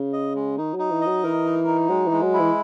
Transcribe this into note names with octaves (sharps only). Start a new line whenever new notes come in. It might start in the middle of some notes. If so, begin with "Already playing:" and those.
Already playing: C#3
D#5
G#3
D#3 D#4
F#3 D#4
E3
D#5
F#3
E3 A#4
D#4
D#4
F#3 G#3
E3
G#3
F#3
E4
E3